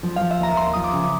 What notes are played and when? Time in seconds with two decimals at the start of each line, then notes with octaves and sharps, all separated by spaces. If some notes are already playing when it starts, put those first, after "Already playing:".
0.03 F3
0.16 F3 F5
0.31 E5
0.40 D#2 A#5
0.57 D#2 C6
0.73 F3 D#6
0.84 D6
0.93 C#3